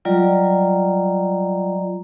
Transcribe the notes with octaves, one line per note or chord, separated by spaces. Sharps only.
F#3 G3 F4 D5 D#5 A#5